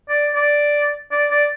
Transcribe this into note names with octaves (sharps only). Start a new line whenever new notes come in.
D5
D5
D5
D5